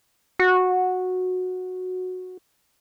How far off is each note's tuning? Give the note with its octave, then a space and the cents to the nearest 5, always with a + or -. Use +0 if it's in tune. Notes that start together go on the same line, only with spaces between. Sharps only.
F#4 -10